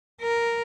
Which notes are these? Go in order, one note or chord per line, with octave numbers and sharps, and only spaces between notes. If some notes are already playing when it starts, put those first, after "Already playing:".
A#4